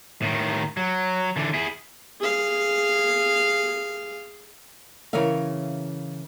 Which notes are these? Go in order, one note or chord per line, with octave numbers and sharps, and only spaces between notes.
A2 D#3
F#3
D3 E3
E4 G#4
G#4 F5
C#3 E3 A#4 C#5 E5 F5